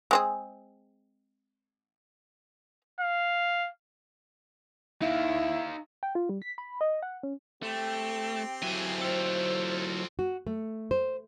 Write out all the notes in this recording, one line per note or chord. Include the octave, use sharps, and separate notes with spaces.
G#3 C4 G#4
F5
D#4 E4 F5
G5
F4
G3
B6
B5
D#5
F#5
C#4
A3 C4 G4
F#3 E4 A4 G#5
F4 A4 C5
F#4
A3
C5